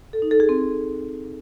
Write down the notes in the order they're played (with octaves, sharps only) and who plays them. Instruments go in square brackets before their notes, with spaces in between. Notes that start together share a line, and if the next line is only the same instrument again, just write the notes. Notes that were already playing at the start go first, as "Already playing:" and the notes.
[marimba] A4
D#4
A4
G#4
C4